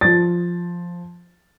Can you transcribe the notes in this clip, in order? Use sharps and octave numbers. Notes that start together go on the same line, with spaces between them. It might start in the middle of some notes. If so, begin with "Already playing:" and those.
F3 A6